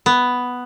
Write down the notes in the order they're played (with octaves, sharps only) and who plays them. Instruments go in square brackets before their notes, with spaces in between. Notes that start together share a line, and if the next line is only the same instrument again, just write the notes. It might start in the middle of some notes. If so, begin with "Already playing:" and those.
[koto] B3